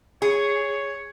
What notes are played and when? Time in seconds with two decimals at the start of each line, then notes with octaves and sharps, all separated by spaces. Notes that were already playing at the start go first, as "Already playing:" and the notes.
0.22 G#4 C#5